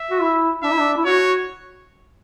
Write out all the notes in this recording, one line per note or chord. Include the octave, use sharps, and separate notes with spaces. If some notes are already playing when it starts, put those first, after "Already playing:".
Already playing: E5
F#4
E4
D4 E5
E4
D4
E4
F#4 C#5